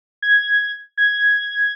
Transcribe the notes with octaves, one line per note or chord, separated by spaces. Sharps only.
G#6
G#6